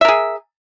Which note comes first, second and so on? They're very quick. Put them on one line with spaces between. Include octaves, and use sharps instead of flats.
E5 A#4 G#4